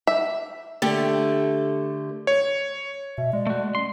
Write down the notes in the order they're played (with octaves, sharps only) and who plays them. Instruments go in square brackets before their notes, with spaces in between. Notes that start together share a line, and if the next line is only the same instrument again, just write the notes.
[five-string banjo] E5
[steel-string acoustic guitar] D3 A3 G4
[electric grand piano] C#5
[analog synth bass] B2 [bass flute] E5
[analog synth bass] G#3 [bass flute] D5
[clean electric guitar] A3 F#4
[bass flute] C#4 [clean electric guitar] C6